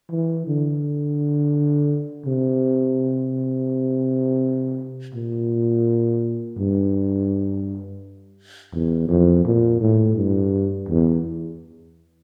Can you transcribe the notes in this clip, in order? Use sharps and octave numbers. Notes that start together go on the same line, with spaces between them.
E3
D3
C3
A#2
G2
E2
F2
A#2
A2
G2
E2